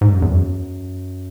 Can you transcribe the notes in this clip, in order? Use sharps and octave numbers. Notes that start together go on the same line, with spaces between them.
G#2
F#2
E2
F#2